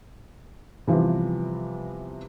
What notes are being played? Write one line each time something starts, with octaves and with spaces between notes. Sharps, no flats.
C3 E3 F3 G3 B3